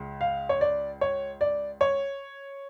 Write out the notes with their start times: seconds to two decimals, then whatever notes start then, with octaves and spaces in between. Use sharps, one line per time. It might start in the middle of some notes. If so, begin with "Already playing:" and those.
Already playing: C#2 C#3
0.21 F5
0.49 C#5
0.61 D5
1.01 C#5
1.41 D5
1.81 C#5